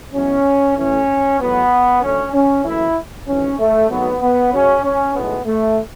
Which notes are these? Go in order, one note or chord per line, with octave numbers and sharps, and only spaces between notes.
E2 B2 F#3 C#4
A1 A2 E3 A3 C#4
E2 B2 F#3 A3 B3
F#2 D3 A3 C#4
C#4
F#1 F#2 E3 A3 E4
G#1 G#2 E3 C#4
A3
G#1 G#2 F#3 A3 B3
B3
F#2 C#3 F#3 C#4
C#4
B1 A2 G#3 B3
A3